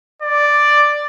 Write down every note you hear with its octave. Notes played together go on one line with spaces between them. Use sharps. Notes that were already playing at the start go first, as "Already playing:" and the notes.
D5